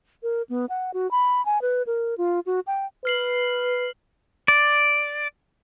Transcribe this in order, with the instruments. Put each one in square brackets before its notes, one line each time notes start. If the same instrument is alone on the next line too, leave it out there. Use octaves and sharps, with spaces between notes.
[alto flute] A#4
B3
F#5
F#4
B5
G#5
B4
A#4
F4
F#4
G5
[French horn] B4 [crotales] F6 C7 F#7
[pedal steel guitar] D5